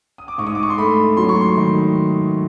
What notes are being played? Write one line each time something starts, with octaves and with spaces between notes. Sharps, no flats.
D#6
D6
G#2 C#6
D#6
D6
C#6
C6
A3 B5
F#3 C6
C#6
C6
D#3